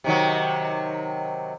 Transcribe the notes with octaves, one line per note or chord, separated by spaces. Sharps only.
C3 D#3 F#3